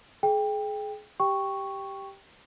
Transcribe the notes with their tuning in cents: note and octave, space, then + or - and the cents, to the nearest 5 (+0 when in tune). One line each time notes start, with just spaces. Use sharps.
G#4 +30 G5 +20
G4 +0 G5 +0 C#6 +0